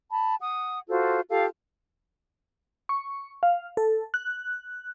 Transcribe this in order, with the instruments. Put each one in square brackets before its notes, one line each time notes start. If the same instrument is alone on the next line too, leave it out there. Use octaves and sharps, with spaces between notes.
[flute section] A5 B5
F#5 D#6
F4 F#4 A4 C5
F4 G4 A4 F5
[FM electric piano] C#6
F5
A4
F#6